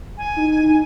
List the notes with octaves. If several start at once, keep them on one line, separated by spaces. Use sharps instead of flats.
G#5
D#4
D#4